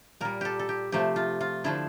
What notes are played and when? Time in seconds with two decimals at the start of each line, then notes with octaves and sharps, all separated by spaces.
0.21 A#2 G3 A#4
0.41 G4 A4
0.59 A4
0.69 G4
0.92 C3 F3 A3 G4
1.16 F4
1.41 F4
1.64 D3 F3 A3 E4